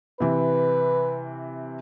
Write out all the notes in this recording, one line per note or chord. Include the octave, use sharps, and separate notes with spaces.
C3 E3 B4